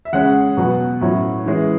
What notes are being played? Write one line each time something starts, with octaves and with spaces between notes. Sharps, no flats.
E5
C#3 G#3 C#4 F#5
B2 F#3 B3
A2 F#3 C#4
E3 G#3 C#4